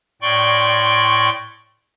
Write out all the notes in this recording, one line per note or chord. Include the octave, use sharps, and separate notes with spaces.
A2 D5 G5 C6 C#6